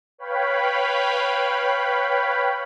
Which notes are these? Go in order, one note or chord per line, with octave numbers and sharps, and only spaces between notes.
B4 C#5 F5 G5 B5